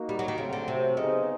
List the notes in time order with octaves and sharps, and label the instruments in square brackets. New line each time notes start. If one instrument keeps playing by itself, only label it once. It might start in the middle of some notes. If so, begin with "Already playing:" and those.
Already playing: [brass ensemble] A#3 D#4 F#4
[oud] G3
F#3
D#3
[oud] C#3 [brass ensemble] F#3 A3 C4
[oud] D3
C3
[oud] C#3 [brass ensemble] B3 D#4 G#4 C5 D#5